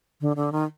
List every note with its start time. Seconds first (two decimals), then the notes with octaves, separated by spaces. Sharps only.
0.21 D3
0.36 D3
0.52 D#3